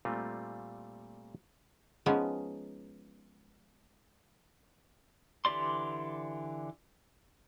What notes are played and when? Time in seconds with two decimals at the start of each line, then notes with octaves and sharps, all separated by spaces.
0.05 A#2 G3 A3 C4 F4
2.06 F3 G#3 B3 C#4 D#4
5.45 D3 E3 G4 D5 C6